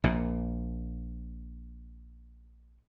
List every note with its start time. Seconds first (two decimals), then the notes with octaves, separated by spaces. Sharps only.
0.04 A#1 A#2